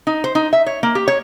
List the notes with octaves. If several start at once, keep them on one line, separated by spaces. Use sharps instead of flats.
D#4
C5
D#4
E5
C#5
A#3
G4
C#5